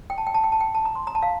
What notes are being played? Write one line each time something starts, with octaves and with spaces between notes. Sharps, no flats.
G5
A5
G5
A5
G5
A5
G5
A5
A#5
C6
A#5
A5
F5